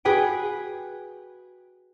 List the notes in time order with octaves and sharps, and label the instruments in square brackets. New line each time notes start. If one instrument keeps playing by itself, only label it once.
[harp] F#4 G#4 B4 G5